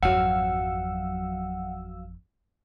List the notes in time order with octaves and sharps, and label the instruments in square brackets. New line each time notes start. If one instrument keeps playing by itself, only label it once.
[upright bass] G#1 F2 [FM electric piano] F#3 F5 E6 [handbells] F#5